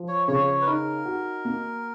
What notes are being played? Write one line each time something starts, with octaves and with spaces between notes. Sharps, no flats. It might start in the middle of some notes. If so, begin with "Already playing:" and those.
Already playing: F3
C#5
C#3 C#5
C#5
B4
D#4 A#4
F#4
A#3